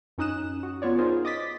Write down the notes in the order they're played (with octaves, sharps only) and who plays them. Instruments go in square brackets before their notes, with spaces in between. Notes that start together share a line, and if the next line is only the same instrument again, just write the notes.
[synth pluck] F#2 C#4 D#4 D#6 F#6 E7
F#4
B3 F4 C#5 D5
D#4 F4 G#4 A#4 C5
D#5 D6 D#6 A6 B6